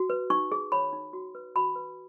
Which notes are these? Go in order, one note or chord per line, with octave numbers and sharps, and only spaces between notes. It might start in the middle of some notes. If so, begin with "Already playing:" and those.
Already playing: F#4
B4
D#4 C#6
G#4
C#5 B5
D#4
F#4
B4
F#4 B5
B4